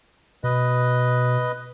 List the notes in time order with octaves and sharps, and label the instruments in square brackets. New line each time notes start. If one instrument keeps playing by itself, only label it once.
[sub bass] B2 [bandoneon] B4 D#5